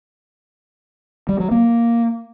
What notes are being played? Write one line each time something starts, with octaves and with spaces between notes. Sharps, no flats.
G3
F#3
A#3